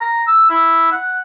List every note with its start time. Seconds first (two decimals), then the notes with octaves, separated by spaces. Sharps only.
0.01 A#5
0.27 E6
0.50 E4
0.92 F#5